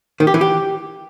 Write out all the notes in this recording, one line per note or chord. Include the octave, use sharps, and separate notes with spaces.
D#3
G4
E3
G4